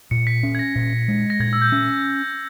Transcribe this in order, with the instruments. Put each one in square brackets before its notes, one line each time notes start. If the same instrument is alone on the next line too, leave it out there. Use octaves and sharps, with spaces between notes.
[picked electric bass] A#2 [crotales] C#7
[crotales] B6
[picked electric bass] C#4
[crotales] G#6
A#6
[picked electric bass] A#2
G#3
[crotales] A#6
[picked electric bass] A#2 [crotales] G#6
[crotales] E6
G6
[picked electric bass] C#4